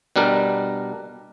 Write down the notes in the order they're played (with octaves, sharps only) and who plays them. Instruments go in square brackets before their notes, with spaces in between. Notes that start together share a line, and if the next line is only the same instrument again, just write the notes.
[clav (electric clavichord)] B2 G3 D4 A#4